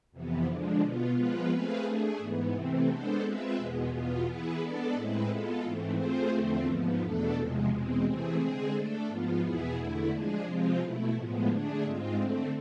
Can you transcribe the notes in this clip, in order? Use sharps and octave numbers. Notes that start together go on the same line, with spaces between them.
F2 C3 E3 B3
D3 F3 G#3 D4
B2 B3 F4
F3 G#3 B3 F4 B4
A3 C4 G#4 B4 F5
A3 D4 G#4
G#2 E3 B3
C3 E3 A3 C4
G#3 B3 D4 A4 C5
G#3 C4 F4 B4 E5
E2 B2 G#3 B3
E2 B2 B3 F4
E3 B3 E4 G#4 B4
G#3 B3 D4 A4 D5
A2 G#3 C4 E4 B4
G#3 B3 F4 A4
G#2 E3 A3 C4
A3 C4 F4 G#4 C5
E2 D3 F3 A3 C4
G#2 F3 B3
E2 B2 A3 D4 A4
E2 C3 F3 G#3
E2 B2 G#3 C4
C3 E3 A3 C4 G#4
D3 G#3 C4 G#4
A3 D4 A4
G#2 F3 B3 F4
E2 B2 B3 E4 G#4
E2 D3 A3 E4
F3 G#3 D4 G#4
C3 F3 G#3 C4 F4
B2 A3 E4
A2 F3 G#3 B3
D3 A3 D4 G#4
G#2 G#3 C4 F4
D3 A3 C4